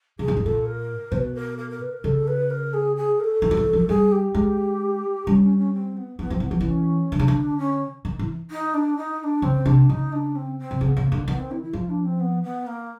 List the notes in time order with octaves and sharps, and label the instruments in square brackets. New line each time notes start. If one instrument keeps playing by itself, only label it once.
[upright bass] B2 [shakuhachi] G#4
[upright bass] A#2
A2
[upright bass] A#2 [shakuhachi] A4
[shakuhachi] A#4
[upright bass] B2 [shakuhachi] B4 C5
[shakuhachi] A#4
A#4
A#4
B4
A#4
[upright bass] C#3 [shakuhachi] A4
[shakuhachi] B4
A#4
G#4
G#4
A#4
A4
[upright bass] D#3
F3
E3
F3
[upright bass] G3 [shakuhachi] G#4
[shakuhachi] G4
[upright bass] G#3
[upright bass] G3 [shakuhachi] C#4
[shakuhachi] C#4
C#4
C4
B3
[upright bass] E3 [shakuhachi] B3
[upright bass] F3 [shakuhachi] C4
[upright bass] E3 [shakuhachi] B3
[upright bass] F3
E3
[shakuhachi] C#4
[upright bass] D3 [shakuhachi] D4
[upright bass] C#3
D3
[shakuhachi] C#4
[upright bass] D#3
E3
[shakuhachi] D#4
D4
D#4
D#4
D4
[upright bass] C#3 [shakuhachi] C4
[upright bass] C3 [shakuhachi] D4
[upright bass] C#3 [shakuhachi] D#4
[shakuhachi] D4
C4
C4
[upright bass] C3
[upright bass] C#3 [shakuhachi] C4
[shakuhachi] B3
[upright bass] C#3
[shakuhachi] A#3
[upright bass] D3
[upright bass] D#3 [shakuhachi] B3
[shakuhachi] C4
E4
E4
[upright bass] F3 [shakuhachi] F4
[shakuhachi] D4
C4
B3
B3
A#3